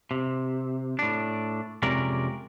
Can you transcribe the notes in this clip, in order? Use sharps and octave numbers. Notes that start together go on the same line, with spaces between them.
C3
A2 D4
F2 C3 G#3 C#4 A#4 D5